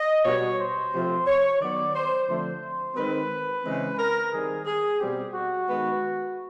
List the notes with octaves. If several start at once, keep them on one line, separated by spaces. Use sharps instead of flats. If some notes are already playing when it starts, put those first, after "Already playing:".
Already playing: D#5
B2 G3 B3 C#5
C5
C3 F3 A3 C4
C#5
D#3 F#3 B3 D5
C5
D3 F3 A3 C4 C5
D#3 G#3 C4 B4
C#3 E3 G#3 C4
A#4
D#3 G3 C4 G#4
G#4
B2 G3 C4 G4
F#4
D#3 G#3 B3